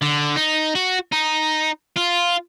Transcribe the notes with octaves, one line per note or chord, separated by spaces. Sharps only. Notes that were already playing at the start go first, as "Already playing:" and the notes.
D3
D#4
F#4
D#4
F4